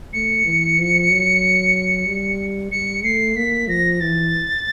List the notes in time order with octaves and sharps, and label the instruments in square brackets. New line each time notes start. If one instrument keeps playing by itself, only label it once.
[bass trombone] A3 [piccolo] C#7
[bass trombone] E3
F3
F#3
G3
[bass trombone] G3 [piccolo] C#7
[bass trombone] A3 [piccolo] C7
[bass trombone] A#3 [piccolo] B6
[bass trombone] F3 [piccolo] A#6
[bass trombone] E3 [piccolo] A6